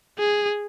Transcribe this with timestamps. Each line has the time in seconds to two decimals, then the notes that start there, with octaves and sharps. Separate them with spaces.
0.18 G#4